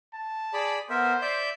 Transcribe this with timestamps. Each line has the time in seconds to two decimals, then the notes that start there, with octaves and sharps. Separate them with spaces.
0.13 A5
0.53 G#4 D5 B5
0.90 B3 A#4 C5 E5
1.22 D5 E5 G6